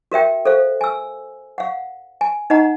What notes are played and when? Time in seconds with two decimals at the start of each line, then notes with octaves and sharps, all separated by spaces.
0.12 F#4 A#4 E5 G5
0.45 A4 C5 F5
0.81 G#5 E6
1.58 F5 F#5
2.21 G#5
2.50 D#4 D#5 F#5 A#5